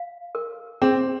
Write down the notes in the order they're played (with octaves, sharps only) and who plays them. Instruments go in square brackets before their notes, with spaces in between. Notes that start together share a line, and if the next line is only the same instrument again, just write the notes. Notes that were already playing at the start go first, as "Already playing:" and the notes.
Already playing: [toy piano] F5
A#4
[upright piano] C4 [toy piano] G#4